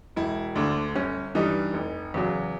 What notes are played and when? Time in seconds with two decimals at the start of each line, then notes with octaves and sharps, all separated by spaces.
0.16 E1 E4
0.55 D2 D3 D4
0.95 G1 C#4
1.35 G2 E3 G3 D#4
1.74 F1
2.14 E2 C#3 F#3